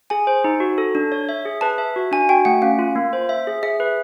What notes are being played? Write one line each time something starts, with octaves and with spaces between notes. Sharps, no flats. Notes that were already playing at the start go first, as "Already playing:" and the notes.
G#4 G#5
C5
D#4
F#4
A4
D4
C#5
E5
G#4
B4 A5
E5
F#4
D4 G#5
F#4 G5
A3 F#5
C#4 F5
F4
A#3
C5
E5
G#4
G#4 E5
B4